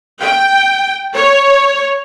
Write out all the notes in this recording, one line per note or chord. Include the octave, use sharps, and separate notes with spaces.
G5
C#5